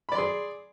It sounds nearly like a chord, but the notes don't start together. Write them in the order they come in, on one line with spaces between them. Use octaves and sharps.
B5 D5 C6 G#4